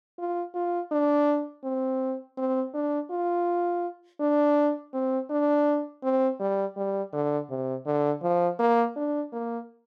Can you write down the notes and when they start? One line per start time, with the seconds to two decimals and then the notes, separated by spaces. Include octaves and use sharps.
0.18 F4
0.55 F4
0.92 D4
1.64 C4
2.37 C4
2.74 D4
3.11 F4
4.20 D4
4.94 C4
5.30 D4
6.03 C4
6.40 G3
6.77 G3
7.13 D3
7.50 C3
7.86 D3
8.23 F3
8.59 A#3
8.96 D4
9.33 A#3